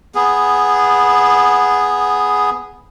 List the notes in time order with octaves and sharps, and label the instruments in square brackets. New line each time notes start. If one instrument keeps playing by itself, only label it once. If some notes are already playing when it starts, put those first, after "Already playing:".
[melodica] B3 G#4